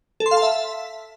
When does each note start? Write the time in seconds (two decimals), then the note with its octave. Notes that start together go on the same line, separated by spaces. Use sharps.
0.20 A4
0.26 C6
0.31 F5
0.37 A5
0.42 E5